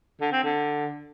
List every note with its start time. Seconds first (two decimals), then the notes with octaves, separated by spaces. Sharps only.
0.21 D3
0.32 C4
0.43 D3